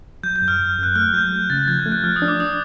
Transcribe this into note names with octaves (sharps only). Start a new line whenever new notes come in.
F#3 G6
G6
F#2
F6
F#2
F#2
F#6
A3 F6
F#3 G6
A3
C#3 A6
F3 G#6
G6
A3
F#6
F3 F6
D#6
D4
D6
D#6